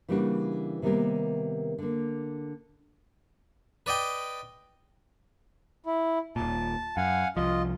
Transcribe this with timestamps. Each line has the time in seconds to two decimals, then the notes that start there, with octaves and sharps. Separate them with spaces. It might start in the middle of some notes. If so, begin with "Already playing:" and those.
0.08 C#3 E3 G3 A#3 D4 F#4
0.82 C3 D#3 G3 A#3 B3 A#4
1.79 D3 A#3
3.86 B4 D5 D#5 G5
5.86 E4
6.36 D#1 A#2 A5
6.97 F#2 F5 F#5 G#5
7.37 C2 F3 F4 D#5